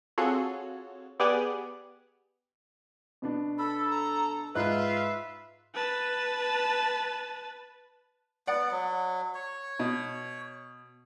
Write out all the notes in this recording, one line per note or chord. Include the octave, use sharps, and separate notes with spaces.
C4 F4 F#4 G#4 A4 C#5
B3 G4 G#4 D5 F#5 G#5
B2 B3 D4
A4 B5
A#5
G#2 D#4 F4 B4 E5 F#6
B4 A5
B3 D5 F#5
F#3
C#5
B2